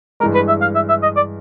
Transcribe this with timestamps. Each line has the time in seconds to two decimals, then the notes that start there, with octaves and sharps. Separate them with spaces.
0.20 G#3 A#4
0.23 G2 E3
0.35 B4
0.48 E5
0.61 F5
0.75 E5
0.89 E5
1.03 D#5
1.16 D5